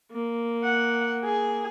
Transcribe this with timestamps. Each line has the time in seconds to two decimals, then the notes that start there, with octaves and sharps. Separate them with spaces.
0.12 A#3
0.64 F#5
1.25 G#4